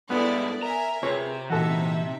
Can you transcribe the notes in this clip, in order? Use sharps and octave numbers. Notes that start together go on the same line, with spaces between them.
G2 G#3 B3 E4 A4 D5
A#4 E5 G#5 A#5
C3 F4 G#4 B4 C#5 A#5
A#2 E3 D#4 F#4 A4 E5